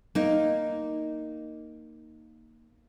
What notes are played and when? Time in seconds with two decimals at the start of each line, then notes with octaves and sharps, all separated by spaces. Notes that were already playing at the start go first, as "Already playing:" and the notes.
0.15 A#3 D#4